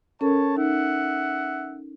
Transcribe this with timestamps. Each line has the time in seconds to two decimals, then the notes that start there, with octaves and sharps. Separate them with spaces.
0.21 C#4 A4 A#4 C#5 A5
0.57 D#4 E5 F#5